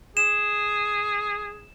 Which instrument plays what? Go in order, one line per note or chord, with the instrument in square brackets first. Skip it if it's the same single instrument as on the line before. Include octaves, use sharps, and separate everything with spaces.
[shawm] G#4 [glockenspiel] E7